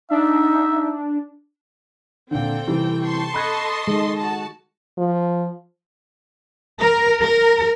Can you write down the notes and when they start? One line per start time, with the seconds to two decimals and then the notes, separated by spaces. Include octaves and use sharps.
0.11 D4 D#4 E5
2.31 A#2 D3 C4 A4 G5
2.67 C3 E3 G3
3.03 A5 C6 C#6
3.34 A4 D#5 B5 F#6 G#6
3.88 D#3 G#3
4.18 F#4 A5
4.98 F3
6.79 A#4
7.24 A#4